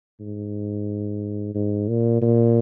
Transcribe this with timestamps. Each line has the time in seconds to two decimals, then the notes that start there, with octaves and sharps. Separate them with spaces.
0.20 G#2
1.55 G#2
1.88 A#2
2.22 A#2